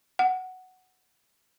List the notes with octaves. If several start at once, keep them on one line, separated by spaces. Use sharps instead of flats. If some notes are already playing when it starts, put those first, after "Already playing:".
F#5